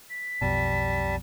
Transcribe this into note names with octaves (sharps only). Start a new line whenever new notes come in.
B6
B1 F2 B2 G3 A5